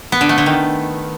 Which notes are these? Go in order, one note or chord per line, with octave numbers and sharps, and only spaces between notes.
B3
D3
A3
D3
D#3